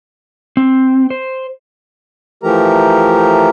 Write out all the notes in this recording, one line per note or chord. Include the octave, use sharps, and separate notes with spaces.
C4
C5
E3 F3 A3 G4 A#4 A#5